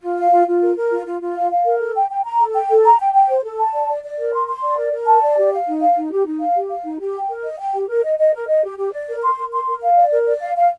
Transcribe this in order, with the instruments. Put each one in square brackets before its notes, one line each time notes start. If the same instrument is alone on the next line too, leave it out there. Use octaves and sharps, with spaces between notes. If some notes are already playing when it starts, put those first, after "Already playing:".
[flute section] F4
F5
F4
F4
A#4
A#4
F4
F4
F4
F5
F5
A#4
A4
G5
G5
A#5
A4
G5
A4
A#5
G5
G5
C5
A4
A5
D5
D5
D5
A#4
C6
C6
D5
A#4
A#4
A5
D5
G4
F5
D#4
F5
D#4
G4
D#4
F5
G4
F5
D#4
G4
G5
A#4
D#5
G5
G4
A#4
D#5
D#5
A#4
D#5
G4
G4
D5
A#4
C6
A#4
C6
A#4
F5
D5
A#4
D5
F5
F5